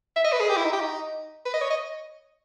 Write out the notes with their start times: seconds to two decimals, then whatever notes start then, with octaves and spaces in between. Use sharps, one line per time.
0.16 E5
0.24 D#5
0.32 B4
0.40 G#4
0.48 G4
0.57 E4
0.64 D#4
0.73 G4
0.80 D#4
1.45 B4
1.54 D#5
1.61 C#5
1.70 D#5